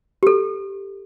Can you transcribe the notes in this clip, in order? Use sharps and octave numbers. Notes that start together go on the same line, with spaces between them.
G4 A4